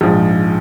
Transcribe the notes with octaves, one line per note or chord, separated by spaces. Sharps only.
A#1 G#2 F3